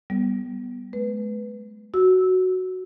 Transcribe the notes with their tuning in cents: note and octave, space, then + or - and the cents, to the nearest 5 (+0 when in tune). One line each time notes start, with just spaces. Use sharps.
G3 -5 B3 -5
G#3 +45 B4 +0
F#4 +0 E6 -15